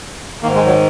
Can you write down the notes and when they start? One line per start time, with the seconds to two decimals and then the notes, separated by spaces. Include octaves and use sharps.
0.43 D#3 A#3
0.46 G#2
0.55 G#3
0.66 F#3